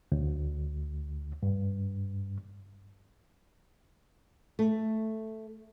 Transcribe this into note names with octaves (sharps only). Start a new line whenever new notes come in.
D2
G2
A3